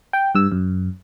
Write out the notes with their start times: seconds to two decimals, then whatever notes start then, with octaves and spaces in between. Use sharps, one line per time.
0.13 G5
0.35 G2 E6
0.52 F#2